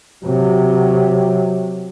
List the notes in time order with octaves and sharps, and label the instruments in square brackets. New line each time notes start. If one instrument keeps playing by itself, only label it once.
[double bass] C3 F#3